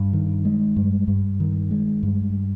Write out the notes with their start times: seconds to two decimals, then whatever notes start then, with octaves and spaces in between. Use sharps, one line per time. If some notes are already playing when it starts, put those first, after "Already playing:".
Already playing: G2
0.13 D#3
0.45 G#3
0.76 G2
1.08 G2
1.40 D#3
1.71 G#3
2.03 G2